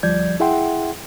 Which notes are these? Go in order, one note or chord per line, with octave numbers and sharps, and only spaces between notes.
D2 F3 G3 D5 G6 G#6
E4 G#4 E5 F#5 G5 C6